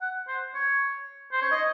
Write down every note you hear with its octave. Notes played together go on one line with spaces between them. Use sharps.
F#5
C5
C#5
C5
C#5
D#5